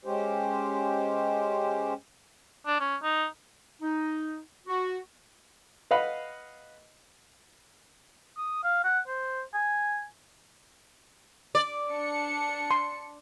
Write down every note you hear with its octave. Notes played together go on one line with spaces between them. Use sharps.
G#3 C#4 G4 C5
D4
C#4
D#4
D#4
F#4
B4 D#5 F5 F#5 B5
D#6
F5
F#5
C5
G#5
D5
D4 C#7
C6